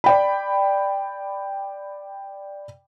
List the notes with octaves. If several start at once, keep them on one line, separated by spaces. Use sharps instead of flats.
D5 G5 B5